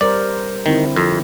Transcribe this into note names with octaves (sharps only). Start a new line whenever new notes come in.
G3 A#4 C5 D5
D3 D#3 C4 E4
F2